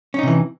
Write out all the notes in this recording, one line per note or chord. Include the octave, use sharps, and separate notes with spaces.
C3 E3 C#4 D#4